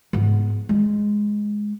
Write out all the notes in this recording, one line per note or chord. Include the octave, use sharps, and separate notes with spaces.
G#2 B3
G#3